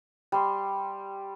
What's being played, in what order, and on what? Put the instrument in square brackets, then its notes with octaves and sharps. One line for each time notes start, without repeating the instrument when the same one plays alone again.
[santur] G3 C6